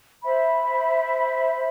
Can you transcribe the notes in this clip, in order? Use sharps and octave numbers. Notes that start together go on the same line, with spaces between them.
C5 E5 B5